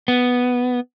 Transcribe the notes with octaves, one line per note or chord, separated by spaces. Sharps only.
B3